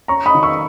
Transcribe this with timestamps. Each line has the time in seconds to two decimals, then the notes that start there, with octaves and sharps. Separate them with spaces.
0.08 C#4 A#5 C#6
0.26 B5 D#6
0.35 D#3
0.43 C#6 E6